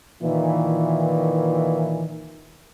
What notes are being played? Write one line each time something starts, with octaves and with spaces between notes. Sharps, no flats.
A#2 D#3 E3